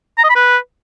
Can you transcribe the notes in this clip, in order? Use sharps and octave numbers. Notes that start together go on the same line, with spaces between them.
A#5
D#5
B5
B4